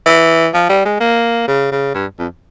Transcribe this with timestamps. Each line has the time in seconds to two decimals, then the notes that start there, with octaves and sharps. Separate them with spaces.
0.06 E3
0.54 F3
0.69 G3
0.85 G#3
1.00 A#3
1.48 C#3
1.72 C#3
1.95 G2
2.19 F2